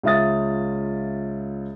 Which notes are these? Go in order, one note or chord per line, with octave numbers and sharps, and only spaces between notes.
C#2 F4 E5 D#6 A6